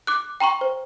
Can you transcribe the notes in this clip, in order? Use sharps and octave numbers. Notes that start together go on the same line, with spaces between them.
D6 F#6
G5 A#5 C6 C#6
C5